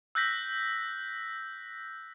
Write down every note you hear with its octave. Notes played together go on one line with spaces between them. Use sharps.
E6 F#6 G6 A#6 B6